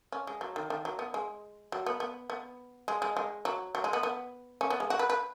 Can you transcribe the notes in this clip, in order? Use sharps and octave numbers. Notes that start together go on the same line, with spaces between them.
C#4
G#3
F#3
D#3
D#3
F#3
B3
G#3
F#3
B3
B3
B3
G#3
G#3
G#3
F#3
F#3
G#3
B3
B3
C#4
B3
G#3
F#4
B4
B4